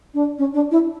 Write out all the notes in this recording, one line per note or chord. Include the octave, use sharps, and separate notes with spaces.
D4
C#4
D4
E4